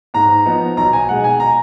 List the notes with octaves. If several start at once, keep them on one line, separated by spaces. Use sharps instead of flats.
G#2 A#5
F3 B3 D#4
B1 A#5
G#5
B2 G#3 D#4 F#5
G#5
A#5